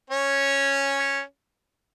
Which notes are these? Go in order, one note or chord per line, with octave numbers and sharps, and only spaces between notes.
C#4 C#5